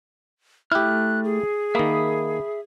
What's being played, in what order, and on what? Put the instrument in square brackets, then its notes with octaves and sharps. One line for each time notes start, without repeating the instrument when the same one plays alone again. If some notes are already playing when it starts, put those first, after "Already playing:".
[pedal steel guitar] A3 F6 [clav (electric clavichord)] E4 G4 [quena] F#6
[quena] G#4
[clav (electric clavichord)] D#3 A#3 [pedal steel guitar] E5 B5 D#6